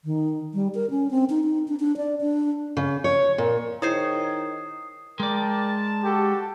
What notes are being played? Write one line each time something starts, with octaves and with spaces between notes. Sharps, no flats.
D#3
G3
A#4
C#4
C4
D#4
D#4
D4
D4
D5
D4
C#3
C#5
A#2
D#3 E4 G#4 C5 C#5 D#6 C7
G#3 A#4 D5 G5 A5 D6
F#4 G4 A4